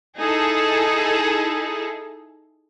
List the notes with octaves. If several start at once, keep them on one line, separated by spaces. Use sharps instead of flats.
D#4 E4 G#4 A4